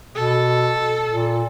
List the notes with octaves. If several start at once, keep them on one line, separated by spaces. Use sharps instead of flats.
B2 A4
A#2